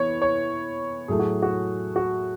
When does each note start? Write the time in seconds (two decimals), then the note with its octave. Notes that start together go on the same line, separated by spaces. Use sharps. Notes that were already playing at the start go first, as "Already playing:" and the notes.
Already playing: E3 B3 C#5
0.22 C#5
1.08 A2 F#3 A3 G#4
1.19 F#4
1.42 F#4
1.96 F#4